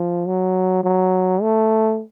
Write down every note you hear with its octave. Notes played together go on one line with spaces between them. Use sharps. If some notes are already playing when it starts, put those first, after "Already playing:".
Already playing: F3
F#3
F#3
A3